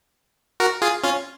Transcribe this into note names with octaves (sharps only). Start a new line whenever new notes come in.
F#4 A#4
F4 G#4
C#4 F4